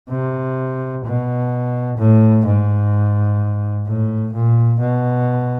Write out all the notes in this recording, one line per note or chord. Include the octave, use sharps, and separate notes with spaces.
C3
B2
A2
G#2
A2
A#2
B2